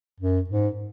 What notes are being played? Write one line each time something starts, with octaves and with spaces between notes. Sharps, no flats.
F#2
G#2